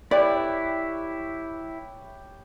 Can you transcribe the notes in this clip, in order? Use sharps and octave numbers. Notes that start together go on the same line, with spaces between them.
E4 G4 B4 C#5 D5